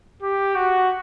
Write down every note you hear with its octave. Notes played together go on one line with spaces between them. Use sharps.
G4
F#4